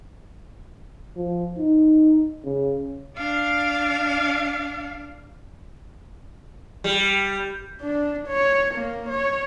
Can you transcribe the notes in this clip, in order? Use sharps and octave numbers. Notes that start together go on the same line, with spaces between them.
F3
D#4
C#3
D4 F5
G3
D4
C#5
A#3
C#5